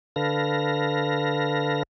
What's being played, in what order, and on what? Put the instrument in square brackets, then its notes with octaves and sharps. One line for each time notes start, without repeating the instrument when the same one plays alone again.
[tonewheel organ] D3 A4 B4 F5 A#6